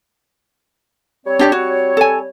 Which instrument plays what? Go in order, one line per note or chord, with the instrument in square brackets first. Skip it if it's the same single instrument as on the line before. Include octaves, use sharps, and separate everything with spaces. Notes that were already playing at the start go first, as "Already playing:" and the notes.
[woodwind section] G3 C4 C#5
[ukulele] D4 G4 D5
F#4
A4 G#5